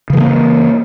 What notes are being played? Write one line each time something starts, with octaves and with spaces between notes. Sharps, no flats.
C#3 E3 G#3 A#3